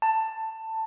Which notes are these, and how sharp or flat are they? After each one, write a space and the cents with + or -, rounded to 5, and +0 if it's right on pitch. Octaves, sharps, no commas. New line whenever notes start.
A5 +15